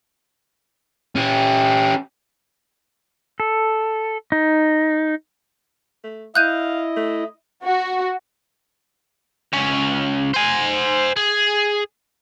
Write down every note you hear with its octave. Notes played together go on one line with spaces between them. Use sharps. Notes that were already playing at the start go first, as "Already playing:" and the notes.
C#4 G4
A4
D#4
A3
E4 D#5 F5 F#6 G6 D#7
A3
F#4
C#2 C#4
C5 G#5
G#4